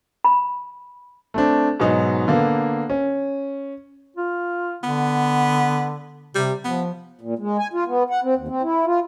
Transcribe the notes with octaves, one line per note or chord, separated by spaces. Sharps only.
B5
A3 C4 D4
G#2 B2 F#3 D#4
D3 A#3 B3
C#4
F4
D3 B3
C3 G3
F3 B3
A#2
G#3
G#5
F4
B3
F#5
C4
D#2
C4
E4
F4